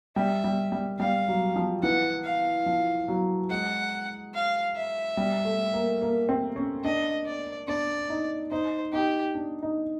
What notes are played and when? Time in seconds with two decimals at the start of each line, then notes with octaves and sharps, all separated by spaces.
0.16 G3 E5
0.44 G3
0.72 G3
1.00 G3 F5
1.28 F#3
1.56 F3
1.83 E3 F#5
2.25 F5
2.66 F3
3.08 F#3
3.50 G#3 F#5
4.34 F5
4.76 E5
5.17 G3
5.45 A3
5.73 A#3
6.02 A#3
6.29 C4
6.56 C#4
6.84 D4 D#5
7.26 D5
7.68 D4 D5
8.10 D#4
8.51 D#4 C5
8.93 D#4 G4
9.35 D4
9.62 D#4